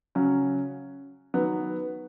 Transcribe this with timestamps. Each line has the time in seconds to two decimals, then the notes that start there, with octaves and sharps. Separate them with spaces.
0.15 C#3 F#3 C#4
1.34 D#3 F#3 B3